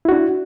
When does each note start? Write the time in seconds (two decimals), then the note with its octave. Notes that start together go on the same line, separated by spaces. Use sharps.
0.05 E4
0.09 F#4
0.12 D4